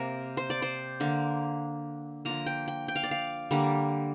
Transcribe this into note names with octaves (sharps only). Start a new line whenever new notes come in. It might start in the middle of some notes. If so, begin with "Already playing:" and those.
Already playing: C3 A#3 A#4 C5
C5
D5
C5
D3 A#3
D3 F3 A#3 A#5
G5
G5
G5
F5
D5
F5
D3 G3 A#3